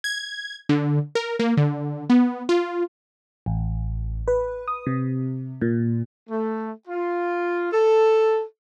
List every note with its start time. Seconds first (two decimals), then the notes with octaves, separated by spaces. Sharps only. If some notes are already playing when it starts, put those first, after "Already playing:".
0.04 G#6
0.69 D3
1.15 A#4
1.39 A#3
1.57 D3
2.10 B3
2.49 F4
3.46 A1
4.28 B4
4.68 D#6
4.86 C3
5.62 A#2
6.29 A3
6.88 F4
7.72 A4